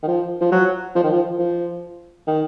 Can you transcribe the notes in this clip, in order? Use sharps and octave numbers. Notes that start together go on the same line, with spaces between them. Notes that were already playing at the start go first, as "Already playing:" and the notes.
D#3
F3
F3
F#3
F3
D#3
F3
F3
D#3